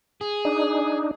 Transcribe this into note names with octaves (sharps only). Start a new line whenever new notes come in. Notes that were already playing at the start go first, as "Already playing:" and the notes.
G#4
D4 D#4